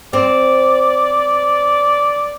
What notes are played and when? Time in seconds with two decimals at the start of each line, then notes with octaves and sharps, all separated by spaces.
0.13 C4 D5